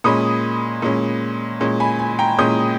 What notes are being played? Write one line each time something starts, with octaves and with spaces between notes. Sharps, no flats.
A#2 G#3 C#4 B5 D#6
A#2 G#3 C#4
A#2 G#3 C#4
G#5 B5
G#5
G5 A#5
A#2 G#3 C#4 D#6 G6